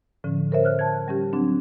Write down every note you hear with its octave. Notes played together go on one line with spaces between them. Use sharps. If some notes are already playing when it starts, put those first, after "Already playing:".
A2 D3 F3 C#4
A4 A#4 C5 C#5 E5
C#5 F6 F#6
A5 G#6
G3 C#4 G4
F#3 C4 D4